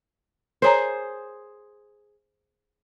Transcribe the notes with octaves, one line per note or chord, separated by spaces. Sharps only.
G#4 A#4 C5 C#5 A#5